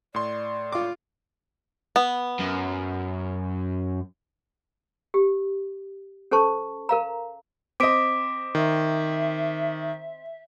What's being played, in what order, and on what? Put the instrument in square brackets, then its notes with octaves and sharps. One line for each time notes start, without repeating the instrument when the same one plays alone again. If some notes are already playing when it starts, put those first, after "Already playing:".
[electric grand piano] A2 C6 [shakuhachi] D5
[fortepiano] F4 D6
[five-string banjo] B3
[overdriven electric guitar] F#2
[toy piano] G4
C#4 A4 C5 A5 C#6
A#4 F5 A#5
[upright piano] C4 D#5 [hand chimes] D6 B6 D7
[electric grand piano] D#3 [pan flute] E5